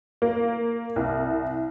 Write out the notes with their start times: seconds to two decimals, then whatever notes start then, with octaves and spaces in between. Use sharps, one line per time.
0.22 A#3
0.96 C2